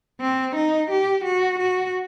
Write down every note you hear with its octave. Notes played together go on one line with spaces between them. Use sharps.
C4
D#4
G4
F#4
F#4